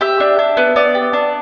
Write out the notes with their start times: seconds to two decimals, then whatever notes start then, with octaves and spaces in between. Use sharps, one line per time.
0.01 G4 E5
0.20 D4
0.39 D4
0.57 B3
0.76 B3 D5
0.95 G4
1.13 D4